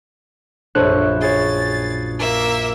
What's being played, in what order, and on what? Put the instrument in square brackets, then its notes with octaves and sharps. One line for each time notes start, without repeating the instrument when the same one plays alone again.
[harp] A#1 F#2 [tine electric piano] D4 F#6 [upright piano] A4 C5 C#5
[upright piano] G#4 C#5 [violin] A6
[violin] A#3 E5